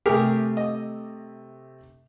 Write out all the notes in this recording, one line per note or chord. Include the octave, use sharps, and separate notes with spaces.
C3 A3 G4 G#4 A#4 D6
D#5